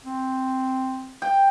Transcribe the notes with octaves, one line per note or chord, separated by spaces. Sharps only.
C4
G5